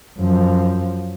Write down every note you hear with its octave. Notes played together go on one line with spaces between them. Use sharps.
F#2 F3